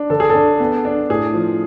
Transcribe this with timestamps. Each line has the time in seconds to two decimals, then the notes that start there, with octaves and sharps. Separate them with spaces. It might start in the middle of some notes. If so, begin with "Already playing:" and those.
Already playing: D4
0.10 D3 A4
0.20 G#4
0.30 A4
0.35 D4
0.60 B3
0.85 D4
1.09 A2 G#4
1.34 F3